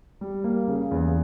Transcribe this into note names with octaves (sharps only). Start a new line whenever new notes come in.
G3
A#3
C#3
E2